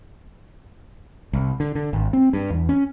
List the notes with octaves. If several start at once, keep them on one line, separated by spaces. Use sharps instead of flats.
C2
D3
D3
G#1
C4
G2
E2
C#4